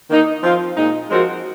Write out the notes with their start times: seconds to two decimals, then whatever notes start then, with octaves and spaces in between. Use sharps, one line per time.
0.09 D#3 A#3 D#4
0.42 F3 C4 F4
0.76 A#2 G#3 D#4
1.10 F3 G#3 C4 F#4 A#4